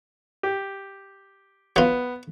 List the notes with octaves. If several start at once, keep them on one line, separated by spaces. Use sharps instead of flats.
G4
F#3 B3 F4